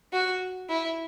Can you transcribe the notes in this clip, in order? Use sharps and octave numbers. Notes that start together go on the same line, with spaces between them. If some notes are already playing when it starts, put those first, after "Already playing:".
F#4
E4